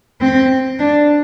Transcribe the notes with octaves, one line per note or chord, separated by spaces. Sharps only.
C4
D4